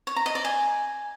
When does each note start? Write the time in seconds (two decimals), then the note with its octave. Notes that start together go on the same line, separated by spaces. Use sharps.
0.07 C#5
0.16 A#5
0.26 D#5
0.35 D5
0.45 G#5